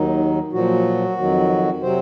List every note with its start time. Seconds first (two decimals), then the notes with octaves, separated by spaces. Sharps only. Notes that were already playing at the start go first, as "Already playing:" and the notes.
Already playing: D#2 D#3 F#3 D#4
0.53 A#2 F3 F#3 F#4
1.18 F2 D#3 F#3
1.82 C3 F#3 C4 C5